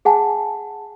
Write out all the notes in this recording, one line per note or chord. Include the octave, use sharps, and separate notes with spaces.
G#4 F#5 G#5 A5